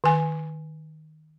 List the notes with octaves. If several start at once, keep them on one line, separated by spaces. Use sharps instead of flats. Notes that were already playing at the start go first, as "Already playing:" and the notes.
D#3 G#5